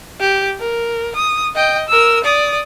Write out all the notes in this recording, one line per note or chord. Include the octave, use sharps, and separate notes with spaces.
G4
A#4
D#6
D#5 G5
A#4 E6
D5 D#6